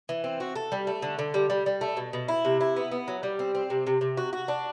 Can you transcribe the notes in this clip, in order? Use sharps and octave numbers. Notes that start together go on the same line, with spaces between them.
E3
C4
F#4
A4
G3
A3
D3
D3
G3
G3
G3
A3
B2
B2
E4
C3
E4
B3
B3
F#3
G3
C4
C4
C3
C3
C3
F#4
F#4
D4